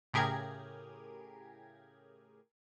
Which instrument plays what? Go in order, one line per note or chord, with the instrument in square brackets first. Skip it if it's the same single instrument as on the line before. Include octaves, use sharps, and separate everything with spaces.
[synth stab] A2 C#3 G4 G#4 A#4 G#6